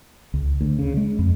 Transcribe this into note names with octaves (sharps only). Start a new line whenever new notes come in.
C#2
D2
C#3
G#3
F2